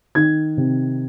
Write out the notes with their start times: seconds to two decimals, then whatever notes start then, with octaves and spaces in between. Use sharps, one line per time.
0.15 D#3 G#6
0.57 C3